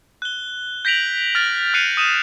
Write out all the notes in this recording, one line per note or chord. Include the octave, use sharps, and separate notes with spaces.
F#6 G7
G6 A#6 B6 D7 F7 F#7
F6 A6 D7
F6 F#6 C7 C#7 D#7 F7
D#6 D#7 E7